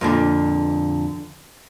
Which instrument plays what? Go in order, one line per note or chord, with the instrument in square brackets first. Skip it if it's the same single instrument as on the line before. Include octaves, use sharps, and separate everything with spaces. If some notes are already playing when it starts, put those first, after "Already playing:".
[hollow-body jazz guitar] F2 A#2 D3